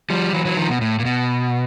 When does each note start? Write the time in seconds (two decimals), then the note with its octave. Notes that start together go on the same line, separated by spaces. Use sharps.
0.10 F3 G3
0.33 E3 F#3
0.45 E3 F#3
0.57 D#3 F3
0.70 B2
0.81 A2
0.99 A#2
1.05 B2